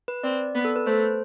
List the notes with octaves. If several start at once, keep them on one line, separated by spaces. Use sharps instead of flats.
B4
C4 D5
B3
A4
B4
A3 C5